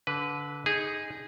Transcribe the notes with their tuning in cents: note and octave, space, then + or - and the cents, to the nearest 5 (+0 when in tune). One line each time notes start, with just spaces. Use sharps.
D3 -25 B4 +0
D#4 +10 G#4 -15